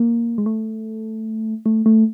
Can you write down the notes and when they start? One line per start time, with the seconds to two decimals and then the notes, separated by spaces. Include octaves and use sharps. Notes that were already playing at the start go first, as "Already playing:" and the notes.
Already playing: A#3
0.38 G#3
0.46 A3
1.66 A3
1.86 A3